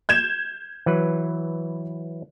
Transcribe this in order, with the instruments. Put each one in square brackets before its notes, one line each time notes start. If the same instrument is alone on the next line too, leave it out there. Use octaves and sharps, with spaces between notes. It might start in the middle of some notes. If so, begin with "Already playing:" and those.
[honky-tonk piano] G6 G#6 E7
[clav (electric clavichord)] E3 F#3 B4